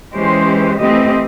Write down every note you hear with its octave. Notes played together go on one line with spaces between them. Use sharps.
E3 G#3 C#4 G4 C5
E3 A3 C4 G4 D#5